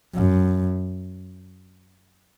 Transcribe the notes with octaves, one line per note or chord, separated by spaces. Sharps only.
F#2